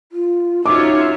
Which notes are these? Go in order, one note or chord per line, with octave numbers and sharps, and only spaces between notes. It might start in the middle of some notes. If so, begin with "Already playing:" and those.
F4
C#4 D#4 F4 F#4 C#5 E5 D6